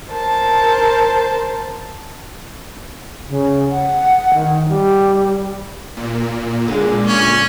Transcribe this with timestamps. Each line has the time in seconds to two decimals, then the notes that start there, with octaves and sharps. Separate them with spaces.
0.12 A#4 C5 A5
3.29 C#3
3.70 F#5
4.34 D#3
4.69 G3
5.97 A#2
6.68 D3 G#3
7.08 C#4